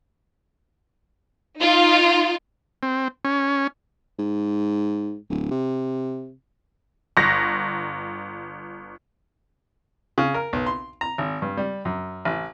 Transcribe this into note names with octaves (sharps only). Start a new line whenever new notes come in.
D#4 F4
C4
C#4
G#2
D1
C3
G1 A#6
C#3
A#4
B1
C6
A#5
G#1
G2
G3
F#2
A1